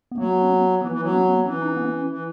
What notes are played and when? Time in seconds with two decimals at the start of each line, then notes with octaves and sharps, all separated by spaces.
0.11 B3
0.18 F#3 A#3
0.33 B3
0.42 C#4
0.49 B3
0.81 E3 B3
0.91 E3
1.02 F#3 B3
1.13 C#4
1.29 B3
1.45 E3 C#4
1.62 D#4
1.68 C#4
1.77 B3
1.85 C#4
2.09 E3